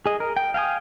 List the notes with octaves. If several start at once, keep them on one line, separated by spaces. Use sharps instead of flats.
G#4 D#5
A#4
G5
F5 G5 G#5 D#6